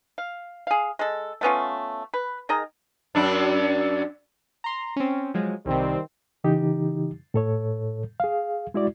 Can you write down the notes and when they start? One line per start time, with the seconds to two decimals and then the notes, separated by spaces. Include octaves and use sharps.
0.18 F5
0.67 G#4 F5
0.99 G#3 A4
1.41 A3 B3 C#4 F4
2.14 B4
2.49 D#3 G#4 D#5 A#5
3.15 F#2 D4
4.64 A#5 C6
4.96 C4 C#4
5.34 F3 F#3 G#3
5.66 C2 C3 D#3 G3 C4
6.44 C#3 E3 D#4 G4
7.34 A2 A4 C#5
8.20 G#4 F5
8.74 G#3 E4 F#4 D5